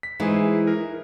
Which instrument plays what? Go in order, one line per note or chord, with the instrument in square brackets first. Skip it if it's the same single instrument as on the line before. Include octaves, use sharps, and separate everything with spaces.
[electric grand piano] B6
[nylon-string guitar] E3 G#3 D#4 [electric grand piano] E4 G#4 C5
[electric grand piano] A#4